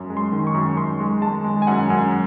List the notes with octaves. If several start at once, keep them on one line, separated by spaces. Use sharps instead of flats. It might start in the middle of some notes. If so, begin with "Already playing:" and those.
Already playing: F#2
G#3
C6
D#3
C#6
F#2
F#2 C6
G#3
G#3 A5
G#3
G#5
F#2 F#5
F#2